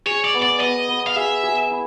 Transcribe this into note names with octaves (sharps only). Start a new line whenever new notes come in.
G#4 C#5
D5
B3
D5
B3 D#5
B3
F5
G#4 E5
G#4
E4